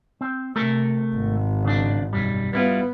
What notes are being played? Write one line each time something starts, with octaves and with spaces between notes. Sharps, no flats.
C4
C3 A3 A4 A#4
G#1
C#3 D4
B1 F#2 G3
G3 B3 E4 F4